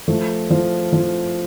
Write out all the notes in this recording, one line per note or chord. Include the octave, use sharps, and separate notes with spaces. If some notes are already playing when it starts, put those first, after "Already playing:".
F3 A3
F3
F3